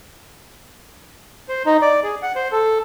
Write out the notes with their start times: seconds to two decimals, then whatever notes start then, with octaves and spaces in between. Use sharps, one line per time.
1.49 C5
1.66 D#4
1.82 D5
2.03 G#4
2.22 F#5
2.36 C5
2.52 A4